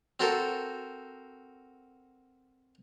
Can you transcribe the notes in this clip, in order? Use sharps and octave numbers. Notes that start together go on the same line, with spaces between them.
C4 F#4 A4 A#4 C5